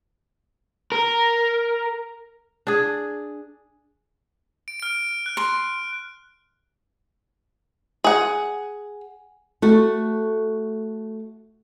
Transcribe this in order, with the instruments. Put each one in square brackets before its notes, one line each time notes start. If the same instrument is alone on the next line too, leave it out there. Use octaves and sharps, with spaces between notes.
[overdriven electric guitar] A#4
[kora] D4 G#4
[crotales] D7
F6 D7
F#6
[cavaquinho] C6
[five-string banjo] G#4 F#5
[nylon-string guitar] A3 F#4